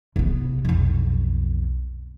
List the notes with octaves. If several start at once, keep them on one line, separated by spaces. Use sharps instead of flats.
C3 B3
B1 F2